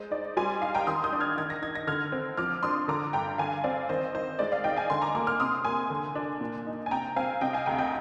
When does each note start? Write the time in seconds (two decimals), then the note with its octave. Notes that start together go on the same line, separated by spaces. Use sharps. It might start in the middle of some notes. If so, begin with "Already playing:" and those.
Already playing: G#3 C5
0.11 D#4 D5
0.37 G3 G#5 C6
0.62 D#4 F5 G#5
0.74 G5 A#5
0.87 D#3 C6 D#6
1.04 D#6 G6
1.13 D4
1.20 F6 G#6
1.37 D#3 G#6
1.50 A#6
1.62 D#4 G#6
1.75 A#6
1.87 D3 F6 G#6
2.12 C4
2.37 F3 D6 F6
2.63 D4 C6 D#6
2.88 D3 A#5 D6
3.13 G2 G5 A#5
3.38 D3 F5 G#5
3.64 C4 D5 F5
3.89 D#3 C5 D#5
4.15 D#4 C5
4.39 G#3 D5
4.52 D5 F5
4.64 D#4 D#5 G5
4.76 F5 G#5
4.90 D3 G#5 C6
5.02 A#5 D6
5.15 A#3 A#5 D6
5.27 D6 F6
5.40 C3 C6 D#6
5.65 A#3 G#5 C6
5.90 D3
6.15 D4
6.41 A#2
6.66 D#4
6.86 G#5
6.91 C3 G5 A#5
7.16 C4 F5 G#5
7.41 C3 D#5 G5
7.53 F5 G#5
7.66 D2 G5 A#5
7.78 D#5 G5